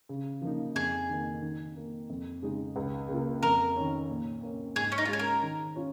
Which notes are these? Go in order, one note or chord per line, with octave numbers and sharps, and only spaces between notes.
C#3
F3 A#3 D#4
F2 G#4
D#3 A#3
D#3
A#3 D#4
F2
C#3 G#3 D#4
C#2
C#3 A#3 F4
F2 A#4
D#3 C#4
A#2
A#3 C#4
G#2 G#4
C#4
D#4
F4
G#3 C#4 G#4
A#4
D#3
C#4 F4